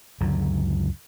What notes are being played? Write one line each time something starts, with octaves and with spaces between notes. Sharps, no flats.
C#2 F#2 D3 F#3